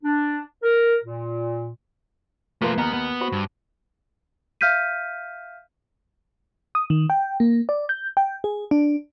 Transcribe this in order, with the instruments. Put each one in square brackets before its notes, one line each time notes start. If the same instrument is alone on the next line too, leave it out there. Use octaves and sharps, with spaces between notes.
[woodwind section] D4
A#4
A#2
[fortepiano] F3 A#3 B4 [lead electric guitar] A3 F4
[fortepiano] D#2 A#5 F6 [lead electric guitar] B3
[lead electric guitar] B3
[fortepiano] F#4 C5 B5
[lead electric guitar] G2
[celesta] E5 F5 F6 G6 B6 D#7
[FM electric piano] D#6
D#3
G5
A#3
D5
G6
G5
G#4
D4